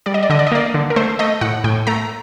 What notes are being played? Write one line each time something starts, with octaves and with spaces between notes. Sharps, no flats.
G3 D5
D#5
D5
D3 D#5
D5
D#5
A#3 D5
D3
A#4
A3 C5
A3 D#5
A2 F#5
A2 G5
A3 A#5